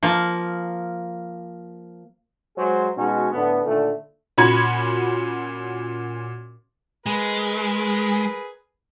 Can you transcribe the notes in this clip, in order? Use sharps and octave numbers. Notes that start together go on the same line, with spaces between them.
F3 A#3
F#3 G#3 G#4 C5
B2 G#3 C#4 D#4 F#4
A2 D3 B3
A#2 D3 D#3 A3
A#2 C#4 F#4 B5 G#6
G#3 G#4 A#4 B4